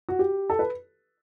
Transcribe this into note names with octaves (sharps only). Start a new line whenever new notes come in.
F#4
G4
A4
B4